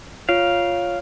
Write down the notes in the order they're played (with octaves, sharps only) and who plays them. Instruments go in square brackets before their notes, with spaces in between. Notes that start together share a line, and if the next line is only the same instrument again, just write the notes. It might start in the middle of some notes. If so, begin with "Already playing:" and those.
[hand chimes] F4 C#5 D7 [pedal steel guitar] F5